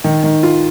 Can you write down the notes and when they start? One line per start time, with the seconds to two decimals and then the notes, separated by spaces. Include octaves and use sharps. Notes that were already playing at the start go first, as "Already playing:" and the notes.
0.04 D#3
0.24 D#3
0.43 F4